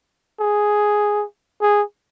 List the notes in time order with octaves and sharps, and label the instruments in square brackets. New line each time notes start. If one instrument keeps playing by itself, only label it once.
[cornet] G#4
G#4